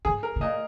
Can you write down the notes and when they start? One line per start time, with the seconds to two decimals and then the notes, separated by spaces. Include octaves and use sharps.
0.05 G#2 G#4
0.23 A#4
0.36 B2
0.41 A#2 D#5